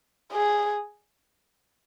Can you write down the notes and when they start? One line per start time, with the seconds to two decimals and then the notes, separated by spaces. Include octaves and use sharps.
0.32 G#4